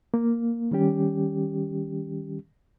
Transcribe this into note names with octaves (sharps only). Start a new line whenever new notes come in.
A#3
D#3 G3 C#4 G4